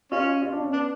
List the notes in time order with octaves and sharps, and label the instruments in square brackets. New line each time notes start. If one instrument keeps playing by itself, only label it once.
[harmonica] C#4 [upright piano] F4
[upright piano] F4
D4
C#4
[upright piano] B3 [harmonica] D4